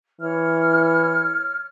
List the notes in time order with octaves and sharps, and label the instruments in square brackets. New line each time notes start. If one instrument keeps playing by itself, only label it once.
[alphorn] E3 [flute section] C#5 F6